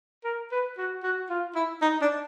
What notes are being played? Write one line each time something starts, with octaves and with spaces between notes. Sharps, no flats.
A#4
B4
F#4
F#4
F4
E4
D#4
D4